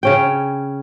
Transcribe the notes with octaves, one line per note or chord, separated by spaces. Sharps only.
C#3 C#4 G5